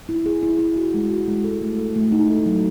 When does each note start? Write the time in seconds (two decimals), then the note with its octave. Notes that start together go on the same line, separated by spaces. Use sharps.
0.09 E4
0.26 G#4
0.43 E4
0.59 E4
0.76 F#4
0.94 G#3
1.10 F#4
1.28 G#3
1.44 A4
1.61 A3
1.78 A4
1.96 A3
2.12 D#4
2.30 A4
2.46 F#3